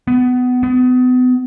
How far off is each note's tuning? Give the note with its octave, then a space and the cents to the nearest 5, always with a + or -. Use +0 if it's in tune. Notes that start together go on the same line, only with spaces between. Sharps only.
B3 +20
B3 +35